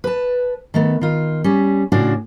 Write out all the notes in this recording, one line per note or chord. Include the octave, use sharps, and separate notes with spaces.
B4 A5
D#3 A3 B3
D#3 F4
G3 C#4
A2 C#3 D4 F4 F#4